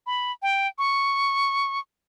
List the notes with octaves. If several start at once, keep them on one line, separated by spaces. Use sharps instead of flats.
B5
G5
C#6